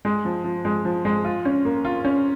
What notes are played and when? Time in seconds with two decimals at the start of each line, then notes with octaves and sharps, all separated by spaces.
0.05 G#3
0.25 F3
0.44 F3
0.65 G#3
0.85 F3
1.05 G#3
1.24 F4
1.45 C#4
1.65 A#3
1.85 F4
2.05 C#4